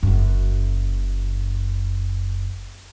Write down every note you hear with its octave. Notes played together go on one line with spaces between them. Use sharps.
F#1 F#2